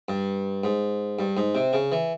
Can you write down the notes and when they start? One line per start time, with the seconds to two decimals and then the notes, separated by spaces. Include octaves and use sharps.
0.09 G2
0.64 G#2
1.19 G2
1.37 G#2
1.55 C3
1.73 C#3
1.92 E3